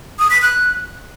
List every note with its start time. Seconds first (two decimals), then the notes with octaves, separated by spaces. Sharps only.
0.19 D#6
0.30 B6
0.42 F#6